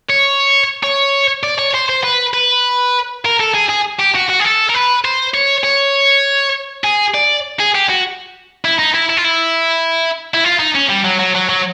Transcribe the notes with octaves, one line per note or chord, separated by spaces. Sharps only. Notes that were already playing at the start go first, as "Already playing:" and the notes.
C#5
C#5
D5
C#5
C5
C5
B4
B4
A#4
A4
G#4
G#4
G4
F#4
F#4
G#4
A4
A#4
B4
C5
C#5
C#5
G#4
D5
G#4
G4
F#4
E4
D#4
E4
E4
F4
E4
E4
F4
D#4
C#4
G3
F#3
F#3
F#3
F#3